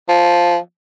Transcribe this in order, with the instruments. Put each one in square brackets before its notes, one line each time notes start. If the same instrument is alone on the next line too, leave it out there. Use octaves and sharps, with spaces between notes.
[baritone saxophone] F3